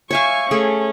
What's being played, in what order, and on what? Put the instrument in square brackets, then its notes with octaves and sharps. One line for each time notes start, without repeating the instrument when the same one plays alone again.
[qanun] C#5 E5 F5 [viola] G#5 C#6
[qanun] A3 G#4 [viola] C#4